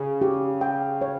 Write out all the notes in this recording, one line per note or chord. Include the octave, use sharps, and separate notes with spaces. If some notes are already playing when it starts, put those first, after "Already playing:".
Already playing: C#3
G4
G5
C#5